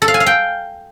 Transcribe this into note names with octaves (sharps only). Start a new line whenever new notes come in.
A4
F5
G#5
F5
G5